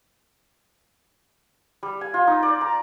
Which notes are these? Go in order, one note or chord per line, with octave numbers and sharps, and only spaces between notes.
G3
G#5
F4
D#4
D5
A#5